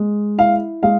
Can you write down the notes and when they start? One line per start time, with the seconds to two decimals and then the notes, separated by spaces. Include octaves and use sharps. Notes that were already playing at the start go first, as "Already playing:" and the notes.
Already playing: G#3
0.38 E4 F5
0.83 G#3 F5